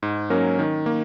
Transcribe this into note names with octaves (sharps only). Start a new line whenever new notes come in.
G#2
F#3 A#3 C#4 A#4
D#3
A#3